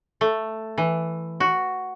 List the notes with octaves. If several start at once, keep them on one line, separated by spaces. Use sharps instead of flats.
A3
E3
F#4